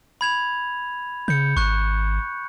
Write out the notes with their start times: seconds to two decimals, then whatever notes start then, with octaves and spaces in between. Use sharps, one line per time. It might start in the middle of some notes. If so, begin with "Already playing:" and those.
0.21 B5 G#6 F7
1.28 C#3 G6 C#7
1.57 G#1 C#6 F#6